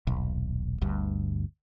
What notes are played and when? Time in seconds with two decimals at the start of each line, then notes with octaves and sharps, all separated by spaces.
0.07 D#1 B1
0.81 G1 D2 G2